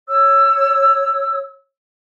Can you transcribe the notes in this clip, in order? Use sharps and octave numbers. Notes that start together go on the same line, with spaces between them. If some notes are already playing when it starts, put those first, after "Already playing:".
C#5 E6